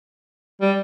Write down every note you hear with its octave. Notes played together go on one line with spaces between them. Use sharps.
G3